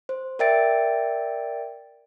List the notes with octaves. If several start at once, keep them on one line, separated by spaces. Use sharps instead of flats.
C5
A#4 D5 E5 G5 A6 D7